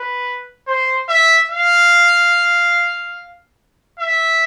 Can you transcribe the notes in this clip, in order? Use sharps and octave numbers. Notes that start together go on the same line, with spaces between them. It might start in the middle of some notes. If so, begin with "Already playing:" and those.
Already playing: B4
C5
E5
F5
E5